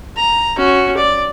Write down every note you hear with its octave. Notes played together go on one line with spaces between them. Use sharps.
A#5
C#4 F#4
D5